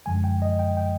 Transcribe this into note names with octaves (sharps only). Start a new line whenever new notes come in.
F#2 D3 F3 G#3 G#5
G5
D#5
G5
G5